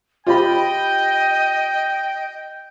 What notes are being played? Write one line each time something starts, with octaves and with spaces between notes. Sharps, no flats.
F4 G4 D#5 G5 B5